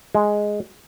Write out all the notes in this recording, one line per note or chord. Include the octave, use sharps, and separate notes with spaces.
G#3